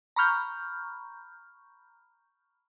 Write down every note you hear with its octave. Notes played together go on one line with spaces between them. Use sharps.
A#5 B5 C#6 F6 G6